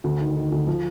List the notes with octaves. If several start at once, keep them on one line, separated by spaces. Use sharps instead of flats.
D2
D#3
D#3
D2
F3